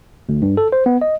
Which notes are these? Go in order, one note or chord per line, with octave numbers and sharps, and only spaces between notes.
D2
G2
A4
C5
B3
D#5